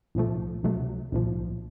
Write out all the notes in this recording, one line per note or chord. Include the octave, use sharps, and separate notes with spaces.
C2 A#2 F3 A3
C#2 C3 F#3 A3
C2 A#2 F3